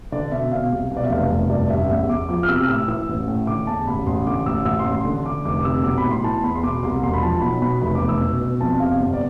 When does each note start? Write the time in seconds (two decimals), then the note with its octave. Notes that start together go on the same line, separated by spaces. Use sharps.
0.12 D3 D5
0.32 B2 E5
0.51 B2 F5
0.72 C2
0.91 B2
0.97 D5
1.04 E5
1.10 F1 F5
1.30 F1
1.50 G2 D5
1.70 A1 E5
1.90 E2 E5
2.09 E2 D6
2.29 F3 D6
2.43 F6
2.49 C3 E6
2.61 F6
2.68 A2 E6
2.88 E3 E6
3.09 A1
3.28 A2
3.47 D3 D6
3.67 E2 A5
3.87 A1 B5
4.06 A1 C6
4.27 D3 D6
4.46 A1 E6
4.65 A1 E6
4.79 C6
4.86 A1
4.92 C6
5.05 D3
5.25 D3 D6
5.45 F1 D6
5.59 D6
5.65 C3 E6
5.84 B1 D6
5.98 B5
6.05 A2
6.11 C6
6.24 E3 A5
6.44 E2 B5
6.55 C6
6.63 B2 D6
6.83 C2 C6
7.02 E1 C6
7.14 B5
7.22 F3 A5
7.42 B1 B5
7.62 B2 B5
7.82 F1 B5
7.95 D6
8.01 F1
8.09 E6
8.21 B2
8.42 B2
8.60 F2 A5
8.80 C3 F5
9.00 G1
9.14 D5